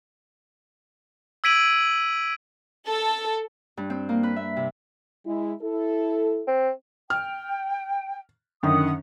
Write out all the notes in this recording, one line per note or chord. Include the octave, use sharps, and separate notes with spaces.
E6 G#6 B6 D7 D#7 F#7
A4
G2
C4
A#3
B4
E5
C3
G#3 E4
E4 A4
C4
G5 F6
F#2 D3 D#3 F#5 D#6